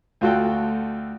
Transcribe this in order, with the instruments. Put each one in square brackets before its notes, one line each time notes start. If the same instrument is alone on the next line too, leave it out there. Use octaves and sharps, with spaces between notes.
[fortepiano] D2 F4 F#4 A4 G5